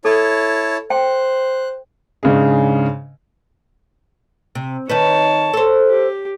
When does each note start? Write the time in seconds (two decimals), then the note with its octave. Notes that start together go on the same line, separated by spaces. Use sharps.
0.05 E4 A4 C#5 A5
0.90 C5 G5 F#6
2.23 G#2 C#3 D4 G#4
4.55 C3
4.89 D#3 D#4 B4 C#5 A5
5.53 A4 C5
5.89 G4